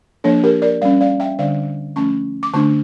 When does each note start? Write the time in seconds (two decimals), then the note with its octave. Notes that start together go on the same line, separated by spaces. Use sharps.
0.24 F3 A#3 D4 A4 C#5
0.43 G4 A#4
0.62 A#4 D5
0.82 G3 C#4 D5 F5
1.01 D5 F5
1.20 E5 G5
1.39 D3 G3 D4 D5 F5
1.96 F3 A3 C#4 A5 C#6
2.43 D6
2.53 D3 A3 D4 A5 C#6